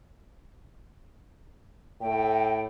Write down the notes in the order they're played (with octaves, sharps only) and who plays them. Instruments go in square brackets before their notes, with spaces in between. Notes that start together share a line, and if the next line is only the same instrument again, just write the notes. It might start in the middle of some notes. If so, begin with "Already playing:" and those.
[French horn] A2 [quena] G5